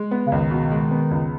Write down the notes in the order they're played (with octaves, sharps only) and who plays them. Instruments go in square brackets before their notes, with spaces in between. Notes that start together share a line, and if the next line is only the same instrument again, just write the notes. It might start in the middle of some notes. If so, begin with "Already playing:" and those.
Already playing: [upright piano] G#3
B3
[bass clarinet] C#3
[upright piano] C#2 [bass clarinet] D#3
[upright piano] B2
G#3
B3
C#2